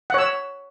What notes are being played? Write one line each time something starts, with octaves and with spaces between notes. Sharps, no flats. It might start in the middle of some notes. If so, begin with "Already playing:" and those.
C#5 F#5 E6